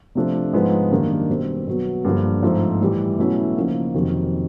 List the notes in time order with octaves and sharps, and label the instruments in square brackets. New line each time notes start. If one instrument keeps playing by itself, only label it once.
[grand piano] C3 F3 A3 D4
G#2 F3 G#3 B3 D#4
F#2 D#3 G3 A#3 D4
B2 G3 C4
B2 F#3 B3
G2 D3 F3 A#3
G#2 F3 A3 C4
A2 E3 G3
B2 F#3 A3 C#4 E4
C#3 F3 A#3 D#4
F2 C3 D#3 F#3